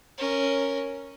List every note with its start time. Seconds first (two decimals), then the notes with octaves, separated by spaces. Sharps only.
0.17 C#4 A#4